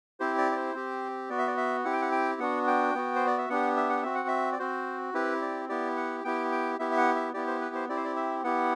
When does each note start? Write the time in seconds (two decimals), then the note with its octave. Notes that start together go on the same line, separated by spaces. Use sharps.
0.20 C4 E4 G4 C5
0.38 D5
0.52 D5
0.56 C5
0.74 C4 G4
1.30 B3 F#4 D5
1.39 E5
1.47 D5
1.57 E5
1.85 C4 E4 G4 F#5
1.93 G5
2.02 F#5
2.12 G5
2.39 B3 D4 F#4 F#5
2.67 G5
2.95 B3 F#4
3.16 C5
3.27 D5
3.38 E5
3.50 B3 D4 G4 F#5
3.77 E5
3.90 F#5
4.03 C4 F#4 E5
4.15 F#5
4.28 E5
4.52 D5
4.59 C4 F#4 C5
5.14 C4 E4 G4 B4
5.42 D5
5.69 B3 E4 G4 D5
5.97 F#5
6.24 B3 E4 G4 G5
6.52 G5
6.79 B3 E4 G4 E5
6.91 E5
6.98 F#5
7.16 E5
7.34 B3 E4 G4 D5
7.47 C5
7.61 B4
7.75 C5
7.89 C4 E4 G4 D5
7.97 C5
8.05 D5
8.16 E5
8.44 B3 E4 G4 F#5